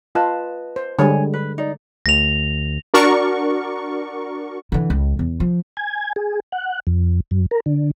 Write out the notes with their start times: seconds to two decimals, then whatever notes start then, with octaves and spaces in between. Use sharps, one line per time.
0.15 F4 B4 D#5 A5
0.76 C5
0.99 D3 G3 G#3 C#5 G#5
1.34 B4
1.58 D#4 D5
2.06 D2 A#6 F7
2.94 D4 F#4 A#4 D5 C#6
4.72 D3 E3
4.90 C#2
5.19 E2
5.40 F3
5.77 G#5
6.16 G#4
6.52 F#5
6.87 F2
7.31 F#2
7.51 A#4
7.66 D3